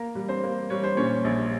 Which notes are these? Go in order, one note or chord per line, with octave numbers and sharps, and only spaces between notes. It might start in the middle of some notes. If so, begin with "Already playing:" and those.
Already playing: A#3 A#4
G3
C4 C5
A#3
G3 C#5
C5
A#2 C#4 C#5
A#1